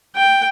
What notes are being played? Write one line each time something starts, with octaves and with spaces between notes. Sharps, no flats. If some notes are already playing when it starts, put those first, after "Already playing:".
G5